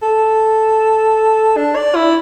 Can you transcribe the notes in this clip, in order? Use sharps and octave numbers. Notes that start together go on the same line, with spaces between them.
A4
D4
D5
E4